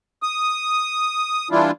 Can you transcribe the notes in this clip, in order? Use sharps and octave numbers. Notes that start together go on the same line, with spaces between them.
D#6
E3 G3 D4 E4 F4